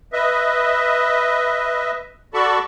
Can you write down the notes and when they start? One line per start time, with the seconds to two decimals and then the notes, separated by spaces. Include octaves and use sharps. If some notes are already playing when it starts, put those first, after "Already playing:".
0.13 B4 D#5 E5
2.34 F#4 A4 D5 A5 B5 C#6